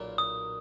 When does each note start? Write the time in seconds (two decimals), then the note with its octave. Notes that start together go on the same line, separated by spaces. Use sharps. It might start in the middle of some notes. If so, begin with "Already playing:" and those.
Already playing: B1 A#2 A#3
0.18 D#6